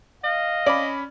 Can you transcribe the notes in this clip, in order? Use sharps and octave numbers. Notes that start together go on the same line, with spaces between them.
D#5 F5
C#4 D5 B5